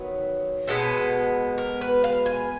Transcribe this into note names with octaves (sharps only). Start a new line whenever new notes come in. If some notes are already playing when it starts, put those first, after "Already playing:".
Already playing: D#3 F#3 B3
B2 G#3 B3 A4
A#4
B4
F5
G#5